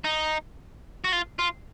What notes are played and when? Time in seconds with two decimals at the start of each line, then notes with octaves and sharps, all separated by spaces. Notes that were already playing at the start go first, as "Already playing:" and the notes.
0.05 D#4
1.04 F#4
1.13 F4
1.39 F4